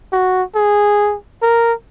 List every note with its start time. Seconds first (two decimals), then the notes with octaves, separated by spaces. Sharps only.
0.13 F#4
0.56 G#4
1.42 A#4